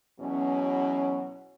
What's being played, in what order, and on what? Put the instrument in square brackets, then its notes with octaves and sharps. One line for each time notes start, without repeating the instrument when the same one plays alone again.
[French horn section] E2 B2 F#3 C#4